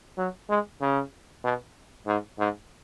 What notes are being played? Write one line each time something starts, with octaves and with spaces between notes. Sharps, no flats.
F#3
G#3
C#3
B2
G#2
G#2